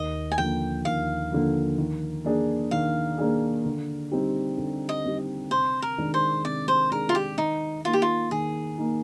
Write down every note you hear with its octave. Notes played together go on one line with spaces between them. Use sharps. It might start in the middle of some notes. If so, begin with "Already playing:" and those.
Already playing: D#2 D#5
G#5
D3 F3 A#3 G5
D#2 F5
D3 F3 A#3
D#3
A#3 D4 G#4
D#3 F5
A#3 D4 G#4
D3
G3 C4 D#4 G4
D3
D#5
G3 C4 D#4 G4
C3 C5
A#4
D#3 G#3 D4 G#4
C5
C3 D5
C5
D#3 G#3 D4 G#4 A#4
F4
G4
D#3 D#4
A#3 D#4 F4
G4
F4
D#3 G#4
A#3 D#4